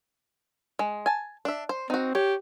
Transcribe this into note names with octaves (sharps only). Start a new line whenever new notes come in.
G#3
G#5 A5
D4 E5
C5
C4 D#4 F#4
G4 C#5